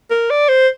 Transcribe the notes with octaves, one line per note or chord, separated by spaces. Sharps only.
A#4
D5
C5